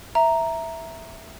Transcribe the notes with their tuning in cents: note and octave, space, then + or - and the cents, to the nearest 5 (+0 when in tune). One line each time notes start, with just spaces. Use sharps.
E5 +0 A#5 +0